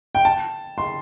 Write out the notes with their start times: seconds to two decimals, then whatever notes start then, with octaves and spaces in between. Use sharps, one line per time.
0.15 G5
0.25 A5
0.78 C6